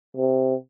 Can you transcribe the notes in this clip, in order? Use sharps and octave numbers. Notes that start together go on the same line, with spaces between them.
C3